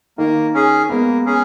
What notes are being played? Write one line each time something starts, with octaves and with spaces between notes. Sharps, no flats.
D#3 A#3
C#4 G#4
G#3 A#3 B3
C#4 G#4